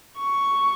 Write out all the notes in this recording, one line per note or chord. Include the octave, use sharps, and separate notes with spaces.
C#6